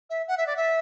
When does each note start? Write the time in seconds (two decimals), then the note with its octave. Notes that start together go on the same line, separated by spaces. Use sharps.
0.10 E5
0.28 F#5
0.37 E5
0.47 D5
0.56 E5